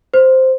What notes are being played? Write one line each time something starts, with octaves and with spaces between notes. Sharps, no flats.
C5